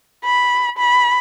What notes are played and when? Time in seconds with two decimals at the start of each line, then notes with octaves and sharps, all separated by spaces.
0.25 B5
0.78 B5